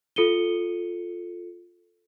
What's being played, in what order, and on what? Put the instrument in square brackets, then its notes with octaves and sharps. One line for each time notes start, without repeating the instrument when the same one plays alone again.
[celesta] F4 A4 C#7 D#7 G7